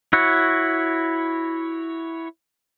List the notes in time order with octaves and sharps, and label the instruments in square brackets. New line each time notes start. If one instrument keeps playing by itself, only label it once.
[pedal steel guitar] E4 F#4 C#5